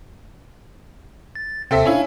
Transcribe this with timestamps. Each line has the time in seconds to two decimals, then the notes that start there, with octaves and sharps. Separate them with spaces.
1.35 A6
1.71 D#2 C3 C4 A4 E5
1.85 C#4 D4 E4 F5 G#5